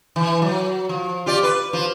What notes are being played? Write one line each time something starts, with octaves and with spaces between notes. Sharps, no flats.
E3
F#3
F3
F4 G4 D5
B4
F3